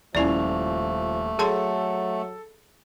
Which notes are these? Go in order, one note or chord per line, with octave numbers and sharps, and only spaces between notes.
D#1 F3 A3 C#4 E4 D5 F7
F#3 G#4 A4 A5 C6